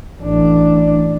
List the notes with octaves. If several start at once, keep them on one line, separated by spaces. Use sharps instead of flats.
A1 D4